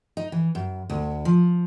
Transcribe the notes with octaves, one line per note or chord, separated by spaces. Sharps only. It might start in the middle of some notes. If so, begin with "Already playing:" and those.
D#4
E3
F#2
D2
F3